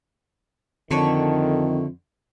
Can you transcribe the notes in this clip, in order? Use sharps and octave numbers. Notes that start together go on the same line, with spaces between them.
F2 D3 D#3 E4 A4 C#5